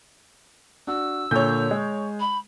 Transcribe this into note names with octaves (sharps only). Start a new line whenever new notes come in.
D4 F#4 E6
A#2 D3 C#5 G6
G#3
B5